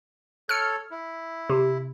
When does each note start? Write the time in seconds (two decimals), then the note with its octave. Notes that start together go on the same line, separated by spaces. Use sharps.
0.49 A4 C#5 F6 C#7
0.91 E4
1.50 C3